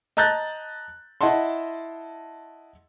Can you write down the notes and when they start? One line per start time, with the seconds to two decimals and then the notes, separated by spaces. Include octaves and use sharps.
0.17 D#5 A5 A#5 F#6 G6 A6
1.21 E4 D#5 F#5 A5 C6